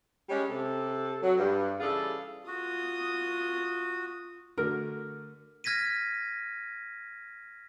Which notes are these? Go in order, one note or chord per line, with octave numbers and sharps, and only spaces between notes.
G3 G#3 C#4
C3 A4
F#3
G2
C#3 E3 G3 F4 G#4 A4
F4 F#4 D#6
D3 A3 F#4 A#4
F6 G#6 A#6 B6 D#7